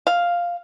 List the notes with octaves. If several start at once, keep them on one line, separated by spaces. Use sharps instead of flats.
F5